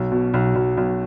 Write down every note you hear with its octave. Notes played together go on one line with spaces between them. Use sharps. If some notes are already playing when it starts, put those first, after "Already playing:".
Already playing: B1
B2
B1
B1
B1